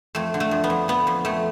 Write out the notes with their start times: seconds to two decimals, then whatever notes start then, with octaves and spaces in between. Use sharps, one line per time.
0.15 F2 A3
0.34 D3
0.40 A3
0.51 F2
0.64 B3
0.70 F2
0.88 F2 B3
1.07 F2
1.25 F2 A3